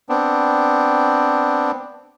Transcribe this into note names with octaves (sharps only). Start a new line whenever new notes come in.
B3 C4 D4